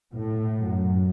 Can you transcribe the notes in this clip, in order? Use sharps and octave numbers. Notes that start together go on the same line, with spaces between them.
A2
F#2